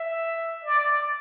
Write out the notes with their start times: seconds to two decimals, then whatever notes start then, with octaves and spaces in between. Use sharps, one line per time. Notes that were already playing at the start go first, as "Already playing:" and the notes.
Already playing: E5
0.64 D5